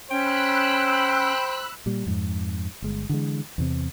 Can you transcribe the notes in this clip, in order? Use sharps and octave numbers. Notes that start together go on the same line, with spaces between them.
C#4 C5 G5 B5 E6 F#6
A#2 G3
F2 G#2
G1 G#3
D3 E3 G#3
E2 C3 C4